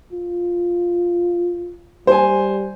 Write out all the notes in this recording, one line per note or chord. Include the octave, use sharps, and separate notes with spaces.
F4
G3 C5 G#5